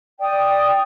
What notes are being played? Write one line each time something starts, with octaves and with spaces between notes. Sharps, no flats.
D5 G5 D#6